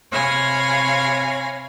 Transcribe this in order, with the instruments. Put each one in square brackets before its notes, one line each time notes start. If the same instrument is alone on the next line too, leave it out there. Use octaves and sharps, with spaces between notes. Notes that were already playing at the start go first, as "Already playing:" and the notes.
[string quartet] C3 C#5 F5 G#5 B5 A#6